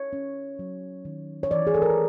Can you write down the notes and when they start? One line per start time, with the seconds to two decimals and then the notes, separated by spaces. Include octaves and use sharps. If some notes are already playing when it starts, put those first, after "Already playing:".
Already playing: C#5
0.13 C#4
0.59 F#3
1.05 D#3
1.43 C#5
1.51 E3 D5
1.67 G#4
1.74 A4
1.82 A#4
1.90 B4